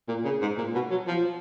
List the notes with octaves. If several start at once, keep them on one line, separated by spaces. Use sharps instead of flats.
A#2
C#3
G#2
A#2
B2
F#3
F3